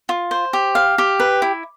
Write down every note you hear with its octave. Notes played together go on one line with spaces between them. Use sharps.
F4
C5
G4
F5
G4
B4
E4